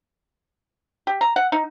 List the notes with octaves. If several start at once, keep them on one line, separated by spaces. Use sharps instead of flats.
G4
A#5
F#5
D#4